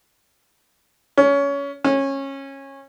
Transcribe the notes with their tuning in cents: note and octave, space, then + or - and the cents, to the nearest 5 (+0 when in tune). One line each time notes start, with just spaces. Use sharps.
C#4 +20
C#4 -20